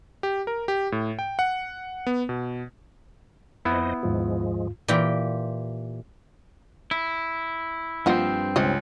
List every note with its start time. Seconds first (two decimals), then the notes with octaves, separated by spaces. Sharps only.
0.23 G4
0.47 A#4
0.68 G4
0.92 A2
1.19 G5
1.39 F#5
2.07 B3
2.29 B2
3.65 F2 B3 E4 C5 D#5
4.03 D#2 G#2 F3 G#3 F4
4.88 A#2 E3 G4 G5
6.91 E4
8.06 G2 F3 A#3 C4 D#5 F#5
8.56 C#2 C5 C#5 D#5